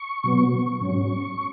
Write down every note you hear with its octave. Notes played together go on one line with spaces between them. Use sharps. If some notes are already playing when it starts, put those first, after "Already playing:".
Already playing: C#6
B2 F#3 B3
G#2 F#3 C#4